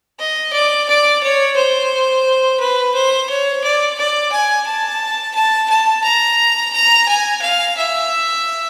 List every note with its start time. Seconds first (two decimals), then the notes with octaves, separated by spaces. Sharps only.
0.19 D#5
0.53 D5
0.88 D5
1.23 C#5
1.56 C5
2.60 B4
2.94 C5
3.29 C#5
3.64 D5
3.98 D5
4.32 G#5
4.66 A5
5.35 A5
5.69 A5
6.04 A#5
6.73 A#5
7.08 G#5
7.42 F5
7.77 E5